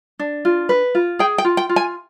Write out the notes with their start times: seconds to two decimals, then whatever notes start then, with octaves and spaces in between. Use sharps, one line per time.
0.19 D4
0.45 F4
0.69 B4
0.95 F4
1.19 G#4 G5
1.38 G5
1.45 F4
1.57 G5
1.69 F4
1.76 G#5